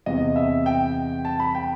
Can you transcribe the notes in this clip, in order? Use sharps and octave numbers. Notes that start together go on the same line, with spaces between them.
E2 C3 E3 B3 D#5
E5
G5
A5
B5
G5